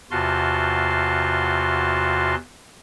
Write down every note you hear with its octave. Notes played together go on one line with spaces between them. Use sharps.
E2 C3 F4 F#4 A5 C6